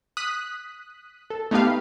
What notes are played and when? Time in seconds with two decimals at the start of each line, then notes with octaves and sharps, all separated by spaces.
0.17 D#6 F#6 B6
1.30 A4
1.51 A3 B3 D#4 G4 B4 F5